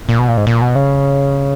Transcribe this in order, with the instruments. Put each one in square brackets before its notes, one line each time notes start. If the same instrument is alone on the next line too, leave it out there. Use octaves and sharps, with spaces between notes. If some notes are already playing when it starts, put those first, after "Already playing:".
[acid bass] A#2
B2
A#2
G#2
A#2
B2
C#3